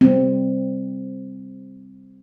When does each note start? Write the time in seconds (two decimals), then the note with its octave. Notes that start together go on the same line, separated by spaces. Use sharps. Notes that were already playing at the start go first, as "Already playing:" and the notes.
0.01 G3 C4